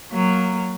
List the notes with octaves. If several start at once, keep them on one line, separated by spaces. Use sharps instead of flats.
F#3 A#3